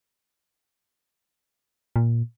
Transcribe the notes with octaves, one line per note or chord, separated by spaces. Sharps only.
A#2